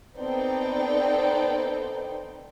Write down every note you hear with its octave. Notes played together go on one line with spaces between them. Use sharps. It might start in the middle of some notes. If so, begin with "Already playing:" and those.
B3 C4 D#4 A4 D5 G5